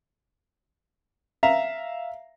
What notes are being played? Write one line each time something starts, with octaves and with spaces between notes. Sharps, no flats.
E5 F5 A#5